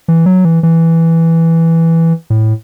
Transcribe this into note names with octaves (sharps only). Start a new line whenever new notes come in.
E3
F#3
E3
E3
A2